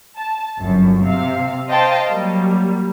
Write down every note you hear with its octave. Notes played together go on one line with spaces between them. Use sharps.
A5
G1 F#2
C3 E5 F5
C5 D#5 F5 G5 A5
F#3 G3 A#3